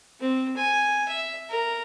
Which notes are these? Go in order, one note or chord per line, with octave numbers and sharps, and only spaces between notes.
C4
G#5
E5
A#4